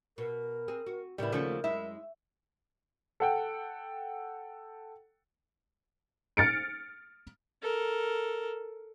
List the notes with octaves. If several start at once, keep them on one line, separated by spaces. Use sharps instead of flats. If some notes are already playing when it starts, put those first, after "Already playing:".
B2 A#4
C4 G#4
F#4
A2 C#3 G3 B3 E4 A#4
D#2 C#3 F3 A3 F#4
F#2 G#3 E4 E5
A4 F#5 G5
F6 A6 C#7 D7
A4 A#4